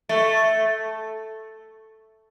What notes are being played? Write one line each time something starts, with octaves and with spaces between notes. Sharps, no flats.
A3